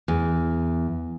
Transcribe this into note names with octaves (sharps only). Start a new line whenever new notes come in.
E2